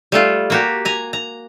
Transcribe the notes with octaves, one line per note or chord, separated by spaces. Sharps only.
G3 A3 F4
A#3 F#4 G4
G#5 A#5
A#5